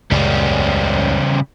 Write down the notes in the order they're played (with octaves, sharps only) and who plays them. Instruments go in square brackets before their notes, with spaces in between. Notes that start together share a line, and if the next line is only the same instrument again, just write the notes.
[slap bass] C#2 F#2 A#2 [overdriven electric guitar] C#3 G3